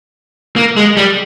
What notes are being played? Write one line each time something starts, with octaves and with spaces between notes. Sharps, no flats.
A#3
G#3
G3